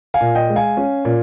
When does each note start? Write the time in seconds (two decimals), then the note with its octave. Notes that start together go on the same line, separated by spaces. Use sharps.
0.14 F5 G#5
0.21 A#2
0.35 D#5 G5
0.50 G#3
0.56 F5 G#5
0.77 C#4
1.05 A#2